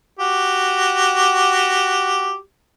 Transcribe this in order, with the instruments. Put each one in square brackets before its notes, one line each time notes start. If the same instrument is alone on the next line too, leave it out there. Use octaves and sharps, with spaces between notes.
[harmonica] F#4 G4